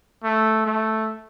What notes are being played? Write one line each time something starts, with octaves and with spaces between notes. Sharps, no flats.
A3
A3